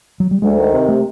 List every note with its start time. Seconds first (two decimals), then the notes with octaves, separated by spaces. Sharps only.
0.20 F#3
0.31 G3
0.42 D2 G#3
0.59 D#3
0.73 C3
0.89 A3